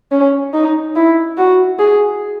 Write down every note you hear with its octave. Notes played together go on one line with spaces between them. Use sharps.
C#4
D#4
E4
F#4
G#4